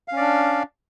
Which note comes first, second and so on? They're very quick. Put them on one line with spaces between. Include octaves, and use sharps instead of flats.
F5 C#4 D5 D4